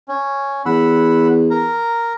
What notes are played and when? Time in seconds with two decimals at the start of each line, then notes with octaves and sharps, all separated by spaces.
0.08 C#4
0.66 E2 F#5 B5 E6
1.50 A#4 A#5